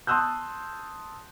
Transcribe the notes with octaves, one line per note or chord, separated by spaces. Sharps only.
A5 C6 D#6 E6 F#6 G6